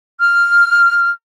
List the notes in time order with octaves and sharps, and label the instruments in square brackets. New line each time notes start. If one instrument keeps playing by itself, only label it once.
[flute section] F6